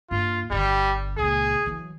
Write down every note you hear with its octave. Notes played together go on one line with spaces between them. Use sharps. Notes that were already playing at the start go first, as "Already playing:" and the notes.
G2 A#3 F4
G1 D3 G3
C#2 A#2 G#4
E3 F#3